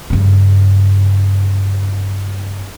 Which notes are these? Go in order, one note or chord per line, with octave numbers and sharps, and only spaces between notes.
G2 C#3